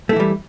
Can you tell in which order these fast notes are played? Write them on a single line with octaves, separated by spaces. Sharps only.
A3 E4 E3 G3